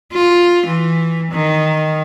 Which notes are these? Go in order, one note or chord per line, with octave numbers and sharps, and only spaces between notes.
F4
E3
D#3